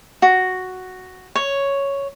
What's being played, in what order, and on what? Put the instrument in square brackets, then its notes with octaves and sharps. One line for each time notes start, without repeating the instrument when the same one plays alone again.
[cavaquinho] F#4
C#5